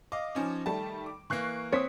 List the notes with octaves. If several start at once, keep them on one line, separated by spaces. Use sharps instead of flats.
D#5 F5 D6
F3 C#4 D#4
D#3 G3 A3 A5
D6
E3 A#3 C#6 F#6 C7
C4 C#5 D#6 B6 C#7